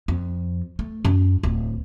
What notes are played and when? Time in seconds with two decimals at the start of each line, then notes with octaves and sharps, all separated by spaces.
0.08 F2
0.79 A3
1.05 F#2
1.43 D1